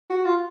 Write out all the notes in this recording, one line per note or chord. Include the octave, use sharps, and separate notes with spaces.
F#4
F4